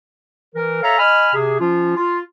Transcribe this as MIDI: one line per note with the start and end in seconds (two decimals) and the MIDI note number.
0.55 0.83 52
0.55 0.83 70
0.83 0.95 69
0.83 0.95 73
0.83 0.95 76
0.83 0.95 77
0.83 0.95 82
0.98 1.30 75
0.98 1.30 80
0.98 1.30 83
0.98 1.30 89
1.34 1.57 48
1.34 1.57 68
1.60 1.95 53
1.60 1.95 61
1.60 1.95 65
1.97 2.19 65